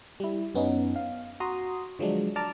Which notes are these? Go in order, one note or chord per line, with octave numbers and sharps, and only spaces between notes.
G3 E4
F#2 B3 C#4 D#4
F5
F#4 A#5 C6 D#6
D3 F3 F#3 G#3 D4
D5 A5 A#5 D6 F6